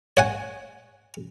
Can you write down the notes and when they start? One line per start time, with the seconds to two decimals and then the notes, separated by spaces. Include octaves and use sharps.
0.17 C#5 F#5 G#5